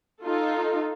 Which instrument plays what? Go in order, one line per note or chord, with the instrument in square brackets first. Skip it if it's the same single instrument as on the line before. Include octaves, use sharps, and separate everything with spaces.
[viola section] D#4 F4 A4